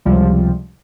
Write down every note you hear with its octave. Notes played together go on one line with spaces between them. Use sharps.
C#2 C3 F3 G3